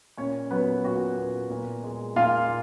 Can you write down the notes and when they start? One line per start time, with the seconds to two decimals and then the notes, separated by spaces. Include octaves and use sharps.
0.17 A#2 C#4 C#5
0.50 F#3 B3 B4
0.84 A#2 F#4
1.17 B3
1.50 A#2
1.83 G#3
2.16 A#2 F4 F5